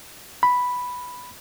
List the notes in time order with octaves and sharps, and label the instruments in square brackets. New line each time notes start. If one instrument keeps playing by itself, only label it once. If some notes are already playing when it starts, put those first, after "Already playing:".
[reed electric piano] B5